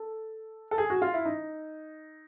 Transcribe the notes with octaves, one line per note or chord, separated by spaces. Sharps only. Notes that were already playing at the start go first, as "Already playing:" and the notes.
Already playing: A4
A4
G#4
F#4
F4
E4
D#4